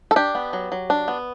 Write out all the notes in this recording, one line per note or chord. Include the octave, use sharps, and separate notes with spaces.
A4
D4 G4
B3
F#3
F#3
D4
B3